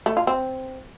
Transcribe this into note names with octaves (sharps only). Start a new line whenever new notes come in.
A3
F4
C4